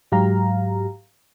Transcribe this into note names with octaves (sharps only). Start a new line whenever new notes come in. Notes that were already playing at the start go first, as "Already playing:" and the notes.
G#2 F#3 G4 F5 A#5